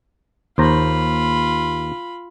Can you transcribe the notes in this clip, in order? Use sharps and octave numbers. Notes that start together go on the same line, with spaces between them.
D#2 F4 C5 A#5 B5